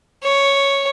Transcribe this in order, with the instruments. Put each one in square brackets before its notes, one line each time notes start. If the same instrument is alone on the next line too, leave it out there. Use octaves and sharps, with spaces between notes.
[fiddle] C#5